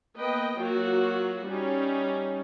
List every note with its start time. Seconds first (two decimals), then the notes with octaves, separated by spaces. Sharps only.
0.17 A#3 B3 B4 D#5 G5
0.59 F#3 A#3 F4 F#4
1.45 G3 C#4 D#4